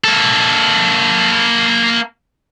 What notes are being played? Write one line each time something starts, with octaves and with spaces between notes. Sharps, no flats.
A#3 A4